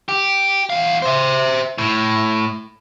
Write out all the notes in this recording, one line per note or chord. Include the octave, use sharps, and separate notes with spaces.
G4
E2 F5
C5 E5
A2